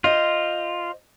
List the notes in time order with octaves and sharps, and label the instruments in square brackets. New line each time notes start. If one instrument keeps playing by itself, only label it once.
[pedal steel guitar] F4 [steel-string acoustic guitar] C5 D#5